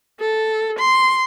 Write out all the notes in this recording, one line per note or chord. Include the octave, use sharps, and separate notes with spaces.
A4
C6